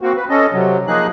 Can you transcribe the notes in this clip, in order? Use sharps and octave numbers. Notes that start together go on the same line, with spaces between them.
A#3 C4 F#4
B4
C#4 A4 D#5
C3 F#3
F3 A#3 D#4 G#4 F#6